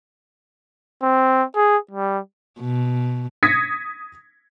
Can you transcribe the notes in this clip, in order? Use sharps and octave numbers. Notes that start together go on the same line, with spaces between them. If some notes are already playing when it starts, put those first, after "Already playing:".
C4
G#4
G3
B2
D#6 G#6 A#6 B6 C#7